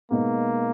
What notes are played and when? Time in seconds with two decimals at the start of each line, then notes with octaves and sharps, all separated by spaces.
0.11 B2 G#3 A#3 B3 D#4